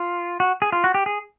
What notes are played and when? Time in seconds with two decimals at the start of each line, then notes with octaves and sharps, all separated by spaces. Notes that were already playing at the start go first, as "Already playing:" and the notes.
Already playing: F4
0.40 F#4
0.62 G#4
0.72 F4
0.84 F#4
0.94 G4
1.06 G#4